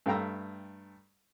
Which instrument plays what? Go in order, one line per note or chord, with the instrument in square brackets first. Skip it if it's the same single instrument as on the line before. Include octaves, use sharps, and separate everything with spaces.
[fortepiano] G2 A3 F5 G5 A#5 E6